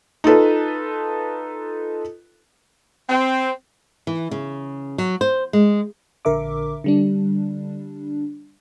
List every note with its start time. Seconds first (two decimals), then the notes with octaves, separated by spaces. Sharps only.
0.24 D#4 F4 A4 B4
3.09 C4
4.07 E3
4.31 C#3
4.98 F#3
5.21 C5
5.53 G#3
6.25 A#1 D3 A#4 E5 D6
6.84 D3 G3 D4